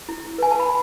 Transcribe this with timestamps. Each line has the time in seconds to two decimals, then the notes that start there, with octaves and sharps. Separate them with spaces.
0.09 E4
0.38 B4 G#5
0.51 A5
0.60 B5